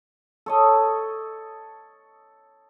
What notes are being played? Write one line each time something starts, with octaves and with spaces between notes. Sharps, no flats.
A4 C#5 D#5